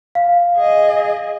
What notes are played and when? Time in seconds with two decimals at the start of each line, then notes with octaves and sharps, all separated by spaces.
0.15 F5
0.57 G#4 D#5